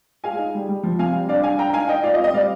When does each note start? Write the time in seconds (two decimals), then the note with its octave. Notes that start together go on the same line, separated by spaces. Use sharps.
0.24 G#3 F5 G#5
0.38 D#4
0.55 G3
0.69 G3
0.83 F3
0.99 C3 F5 G#5
1.14 G3
1.28 D4 D5 F5
1.43 D4 F5 G#5
1.59 D4 G5 A#5
1.73 D#4 F5 G#5
1.88 D#4 D#5 G5
2.03 F4 D5 F5
2.14 D#5
2.19 C4
2.24 D#5
2.33 G3 D5 F5